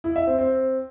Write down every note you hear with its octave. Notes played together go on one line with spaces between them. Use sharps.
E4
E5
C4
C4